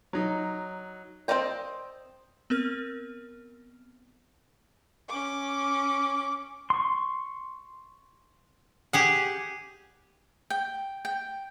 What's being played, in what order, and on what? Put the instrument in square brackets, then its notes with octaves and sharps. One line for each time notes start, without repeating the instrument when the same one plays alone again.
[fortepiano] F#3 D#4
[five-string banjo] C4 A#4 D5 D#5 G5
[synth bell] B3 C4 A#4 F6
[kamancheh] C#4 D6
[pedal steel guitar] C6 C#6
[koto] G4 G#4 F#5
[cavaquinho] G5
G5